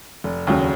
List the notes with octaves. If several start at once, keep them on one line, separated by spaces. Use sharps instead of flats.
F1
D#2 C#3 F#3